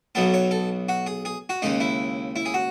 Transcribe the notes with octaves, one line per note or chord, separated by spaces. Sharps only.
B1 B2 F#3 B3 A4
C#5
A4
F#4
G#4
G#4
F#4
D#2 C#3 G#3 D#4
E4
E4
G#4
F#4